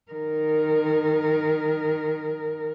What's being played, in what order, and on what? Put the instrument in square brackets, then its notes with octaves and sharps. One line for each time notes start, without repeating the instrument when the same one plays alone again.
[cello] D#3 A#4